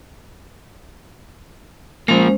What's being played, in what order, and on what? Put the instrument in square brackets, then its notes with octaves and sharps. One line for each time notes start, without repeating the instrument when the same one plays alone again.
[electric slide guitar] F3 A#3 [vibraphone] G#3 C#4 C5